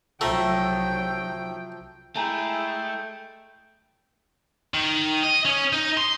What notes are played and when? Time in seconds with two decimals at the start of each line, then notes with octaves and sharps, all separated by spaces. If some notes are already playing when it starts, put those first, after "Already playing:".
0.21 C2 F3 F#3 A3 E5 G5 A#5
2.16 G#3 A3 E4 G5 G#5 A#5
4.74 D#3
5.23 D#5
5.45 C#4
5.73 D#4
5.97 C6